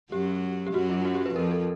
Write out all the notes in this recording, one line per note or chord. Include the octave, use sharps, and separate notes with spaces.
F#2 F#3 G4
G4
F#2 F#3 F#4
F4
F#4
G4
B4
F2 F3 A#4
A4